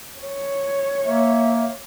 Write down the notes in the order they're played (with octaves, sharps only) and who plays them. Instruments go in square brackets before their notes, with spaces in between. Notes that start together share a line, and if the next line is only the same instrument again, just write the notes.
[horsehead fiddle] C#5
[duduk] A#3 [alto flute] E5